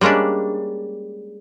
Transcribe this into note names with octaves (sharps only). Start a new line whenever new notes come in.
G3 G#3 A#3 C#4 D4